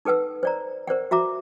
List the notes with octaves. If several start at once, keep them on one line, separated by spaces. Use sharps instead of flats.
D#4 A4 B4 F#5 E6
C5 D5 A#5
A#4 C5 D5 F#5
F#4 E5 A#5 D6